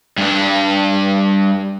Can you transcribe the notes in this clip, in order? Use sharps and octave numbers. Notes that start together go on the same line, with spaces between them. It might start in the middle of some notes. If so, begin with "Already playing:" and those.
G2 D4